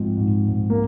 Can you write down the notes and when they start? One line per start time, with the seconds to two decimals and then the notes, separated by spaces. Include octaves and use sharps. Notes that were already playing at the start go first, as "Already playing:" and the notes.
Already playing: G#2 F3 G#3 C4
0.17 G#2
0.48 G#2
0.70 A#3